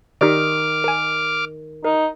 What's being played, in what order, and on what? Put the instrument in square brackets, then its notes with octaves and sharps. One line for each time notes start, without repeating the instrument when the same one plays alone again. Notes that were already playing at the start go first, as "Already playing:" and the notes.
[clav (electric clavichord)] D#3 [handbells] D#4 G4 D5 [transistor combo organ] D6 F6
[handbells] A#4 G#5
[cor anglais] D#4 [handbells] A#4